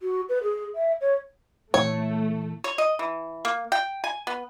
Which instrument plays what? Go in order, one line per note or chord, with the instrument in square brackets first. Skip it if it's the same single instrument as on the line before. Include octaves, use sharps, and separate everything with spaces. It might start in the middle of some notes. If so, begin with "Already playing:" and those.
[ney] F#4
B4
G#4
E5
C#5
[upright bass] A#2 E3 [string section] A3 [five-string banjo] C#5
[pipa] C#5
D#5
E3
A#3
G5
G#5
B3